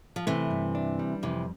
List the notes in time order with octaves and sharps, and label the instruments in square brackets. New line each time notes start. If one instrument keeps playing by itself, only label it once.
[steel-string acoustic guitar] F3
[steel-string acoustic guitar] C3 E3 [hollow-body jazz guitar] A3
[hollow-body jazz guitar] G2
D4
G3
[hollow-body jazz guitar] F2 [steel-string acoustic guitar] C3 E3